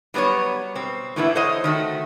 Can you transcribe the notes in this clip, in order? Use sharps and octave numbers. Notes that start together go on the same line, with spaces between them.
F#3 G3 B3 D4 C#5
B2 C4
A2 E3 G3 B3 D4 E4
A4 C5 C#5 D#5 F#5
D#3 A3 F#4